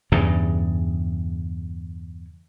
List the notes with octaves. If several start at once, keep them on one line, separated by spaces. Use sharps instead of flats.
E2 G2 C#3